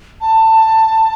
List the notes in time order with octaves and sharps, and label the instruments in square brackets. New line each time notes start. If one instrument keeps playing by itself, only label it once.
[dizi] A5